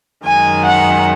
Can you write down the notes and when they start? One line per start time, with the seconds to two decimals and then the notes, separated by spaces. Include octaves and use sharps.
0.24 F#2 D#3 G#3 G#5
0.64 F#5